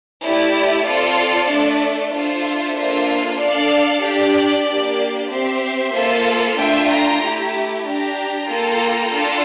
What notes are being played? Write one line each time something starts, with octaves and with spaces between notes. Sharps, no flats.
A3 E4 G4 D5
C4 F4 A4 D5
A3 D4 A4
D4 F4 A4 C5 E5
A#3 D4 F4 A4
D4 A4 D5 F5
D4 G4 D5
A#3 D4 G4
C4 G4 C5 E5
A#3 F4 A4
A3 D4 F4 E5 G5
G5 A#5
A3 E4 G4
D4 G4 G5 A#5
A#3 F4 A4
D4 F4 A4